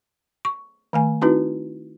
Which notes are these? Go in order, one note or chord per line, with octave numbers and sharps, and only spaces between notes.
C#6
D#3 A3 G#5
C4 D#4 E4 F#4 B4